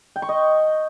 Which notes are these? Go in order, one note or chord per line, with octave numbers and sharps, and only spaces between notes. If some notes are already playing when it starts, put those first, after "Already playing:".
G5
C#6
D#5